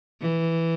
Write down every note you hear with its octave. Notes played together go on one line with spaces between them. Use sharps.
E3